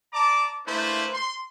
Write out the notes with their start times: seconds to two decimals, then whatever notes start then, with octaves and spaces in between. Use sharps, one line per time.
0.13 D5 A5 A#5 D6
0.66 A3 A#3 D4 E4 B4 C5
1.13 C6